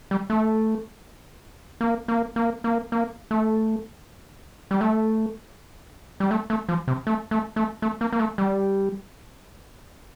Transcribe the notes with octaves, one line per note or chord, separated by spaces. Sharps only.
G3
A3
A#3
A#3
A#3
A#3
A#3
A3
G3
A3
G3
A3
A3
F3
C3
A3
A3
A3
A3
A#3
A#3
A3
G3